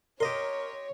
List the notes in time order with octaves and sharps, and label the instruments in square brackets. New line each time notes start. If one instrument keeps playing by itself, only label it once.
[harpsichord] G4 D#5 C6 [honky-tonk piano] A#4 [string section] C#5